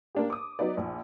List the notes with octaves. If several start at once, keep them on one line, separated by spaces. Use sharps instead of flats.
A#3 D4 G4
D6 D#6
F#3 B3 D#4 D5
A#1